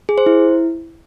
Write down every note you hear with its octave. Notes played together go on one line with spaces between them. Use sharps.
G#4
C5
E4